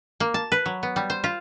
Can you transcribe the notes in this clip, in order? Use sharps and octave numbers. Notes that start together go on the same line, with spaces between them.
A#3
A5
B4
F#3
B3
G3
C5
F4